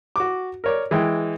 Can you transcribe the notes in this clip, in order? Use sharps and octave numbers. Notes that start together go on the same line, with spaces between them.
F#4 D6
A#4 C#5 D5
E3 G#3 G5